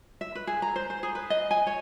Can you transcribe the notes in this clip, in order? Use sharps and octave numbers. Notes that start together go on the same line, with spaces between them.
E5
B4
G#4
A#5
C5
C5
G#4
B4
D#5
G#5
C#5